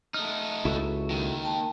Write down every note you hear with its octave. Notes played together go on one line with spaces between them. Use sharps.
A3 D#4 F6
C#2 E4 F#4 A4
D#2 D#3
G5 A5